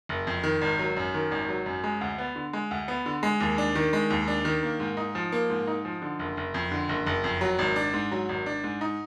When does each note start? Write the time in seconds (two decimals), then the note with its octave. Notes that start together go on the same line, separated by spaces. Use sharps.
0.09 F#1
0.27 F2
0.44 D#3
0.61 G#1
0.79 F#3
0.97 F#2
1.14 D#3
1.31 G#1
1.48 F#3
1.66 F#2
1.84 G#3
2.01 D2
2.18 B3
2.36 D3
2.53 G#3
2.71 D2
2.88 B3
3.06 D3
3.23 G#3
3.40 D#2
3.58 D4
3.75 D#3
3.93 G#3
4.10 D#2
4.28 D4
4.45 D#3
4.63 A#3
4.80 G#2
4.97 D#4
5.15 F3
5.32 A#3
5.50 G#2
5.67 D#4
5.85 F3
6.02 D3
6.19 F#1
6.37 F#1
6.54 F2
6.72 D3
6.89 F#1
7.07 F#1
7.24 F2
7.41 F#3
7.59 G#1
7.76 D4
7.93 G#2
8.12 F#3
8.29 G#1
8.46 D4
8.64 G#2
8.81 D#4